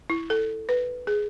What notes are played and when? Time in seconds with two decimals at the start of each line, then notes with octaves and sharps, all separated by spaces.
0.10 E4
0.30 A4
0.69 B4
1.07 G#4